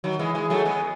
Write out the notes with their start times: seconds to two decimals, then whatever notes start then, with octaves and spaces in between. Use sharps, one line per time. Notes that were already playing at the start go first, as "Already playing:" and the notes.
0.04 D#3 F#3
0.19 E3 G#3
0.35 E3 G#3
0.50 F#3 A3
0.65 G#3 B3